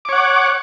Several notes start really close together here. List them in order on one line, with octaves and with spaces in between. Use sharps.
D6 C#5 F#5